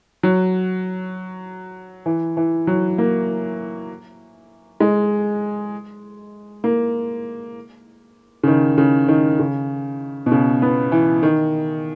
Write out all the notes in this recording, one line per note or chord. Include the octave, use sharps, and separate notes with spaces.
F#3
E3
E3
F#3
A#3
G#3
A#3
C#3
D#3
C#3
D#3
C#3
B2
C#3
B3
E3
D#3